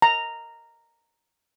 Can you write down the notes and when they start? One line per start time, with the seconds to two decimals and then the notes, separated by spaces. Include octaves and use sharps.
0.02 A#5